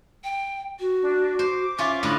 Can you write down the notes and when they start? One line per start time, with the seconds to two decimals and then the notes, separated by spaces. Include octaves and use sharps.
0.24 G5
0.79 F#4
1.02 D4
1.39 C5 D6
1.79 C#4 F4 E5 D6
2.03 A2 D3 B5